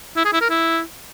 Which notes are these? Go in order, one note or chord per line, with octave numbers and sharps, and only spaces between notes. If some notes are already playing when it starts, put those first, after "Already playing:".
E4
G#4
E4
A#4
E4